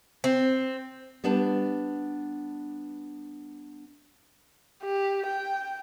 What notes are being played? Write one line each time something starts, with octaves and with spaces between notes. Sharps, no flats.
C4
G3 B3 D4 B4 A5
G4
G5